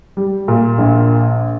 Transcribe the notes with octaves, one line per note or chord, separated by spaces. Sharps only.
G3
A#2
A#1